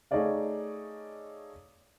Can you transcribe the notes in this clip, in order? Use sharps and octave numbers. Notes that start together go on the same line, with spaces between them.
A3 D#4 G#4 C#5 D5 F5